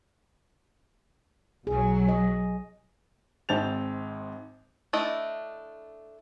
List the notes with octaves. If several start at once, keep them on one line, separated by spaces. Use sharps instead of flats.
B1 F#3 G#4
D#5
G#1 G#2 C4 G6 A6 F7
A3 D4 E4 D#5